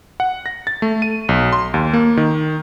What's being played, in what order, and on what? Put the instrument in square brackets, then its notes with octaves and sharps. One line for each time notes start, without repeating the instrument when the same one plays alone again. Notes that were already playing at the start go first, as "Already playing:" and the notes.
[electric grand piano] F#5
A#6
A6
A3
D#7
B1
C6
D#2
A#3
D#3